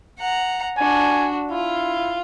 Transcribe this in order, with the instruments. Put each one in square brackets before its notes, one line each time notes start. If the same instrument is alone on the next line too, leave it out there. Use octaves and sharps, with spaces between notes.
[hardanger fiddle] F#5 A#5
[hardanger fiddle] D4 F#4 [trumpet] G#5
[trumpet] E4 [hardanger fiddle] F4